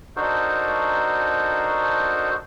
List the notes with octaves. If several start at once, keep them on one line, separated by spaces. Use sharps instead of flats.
D4 D#4 F#4 A4 A#4 C5